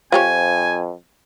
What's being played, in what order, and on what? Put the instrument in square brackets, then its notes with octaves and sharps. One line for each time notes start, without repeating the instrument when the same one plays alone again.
[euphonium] F2 [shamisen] F4 G4 C#5 [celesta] C5 F5 G5 [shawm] G#5